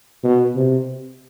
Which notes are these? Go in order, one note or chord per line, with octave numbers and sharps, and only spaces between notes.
B2
C3